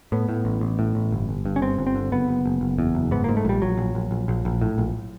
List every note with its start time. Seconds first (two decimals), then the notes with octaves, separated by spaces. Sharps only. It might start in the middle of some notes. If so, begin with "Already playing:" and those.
0.12 A2 B3
0.29 A2
0.45 A1
0.61 A1
0.79 A2
0.95 A1
1.12 G1
1.29 G1
1.45 G2
1.56 C#4
1.62 G1 C4
1.78 G1
1.87 C4
1.95 D3
2.12 F#1 B3
2.28 F#1
2.46 F#1
2.61 F#1
2.78 E2
2.95 F#1
3.11 G#2 B3
3.24 G#2 A#3
3.37 A3
3.45 A#1 G3
3.62 A#1 F#3
3.77 A#1
3.95 A#1
4.11 A#1
4.28 A#1
4.45 A#1
4.61 A2
4.78 A#1